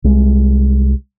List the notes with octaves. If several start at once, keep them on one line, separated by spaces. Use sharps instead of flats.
C2 G#3